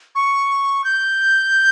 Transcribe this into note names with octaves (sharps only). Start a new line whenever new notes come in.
C#6
G6